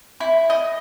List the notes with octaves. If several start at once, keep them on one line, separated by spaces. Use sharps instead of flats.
E4
D#5